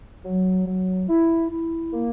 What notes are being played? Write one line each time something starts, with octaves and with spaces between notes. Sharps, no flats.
F#3
F#3
E4
E4
A#3